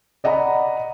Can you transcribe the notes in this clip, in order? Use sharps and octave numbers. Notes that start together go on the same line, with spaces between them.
D5 D#5 F#5 A#5 B5